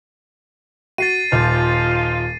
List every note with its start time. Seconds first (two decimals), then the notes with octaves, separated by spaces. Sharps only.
0.98 F#4 A6 C7 D#7
1.32 D#1 F3 D#4 F4